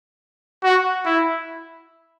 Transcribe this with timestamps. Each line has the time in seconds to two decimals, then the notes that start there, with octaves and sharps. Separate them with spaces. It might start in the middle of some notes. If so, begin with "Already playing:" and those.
0.63 F#4
1.06 E4